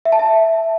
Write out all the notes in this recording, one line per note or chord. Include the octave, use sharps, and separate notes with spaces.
E5
A5
E5